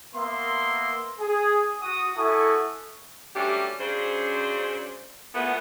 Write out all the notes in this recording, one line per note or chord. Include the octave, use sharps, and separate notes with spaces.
A#3 B3 E5 C6
G#4
F#4 D#6
E4 F#4 A4 G#5 C#6 D#6
F#3 G3 A3 C#4 D4 G4
F#2 C#3 D4 C5
E2 A#2 A3 B3